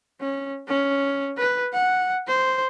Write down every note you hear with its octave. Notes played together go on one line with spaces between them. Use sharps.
C#4
C#4
B4
F#5
C5